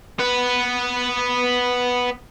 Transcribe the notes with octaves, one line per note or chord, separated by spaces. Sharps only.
B3 B4